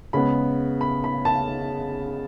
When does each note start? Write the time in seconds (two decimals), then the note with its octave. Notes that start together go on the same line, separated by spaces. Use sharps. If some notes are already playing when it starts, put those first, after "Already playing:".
0.13 C#3 G#3 B3 B5
0.81 B5
1.04 B5
1.25 A5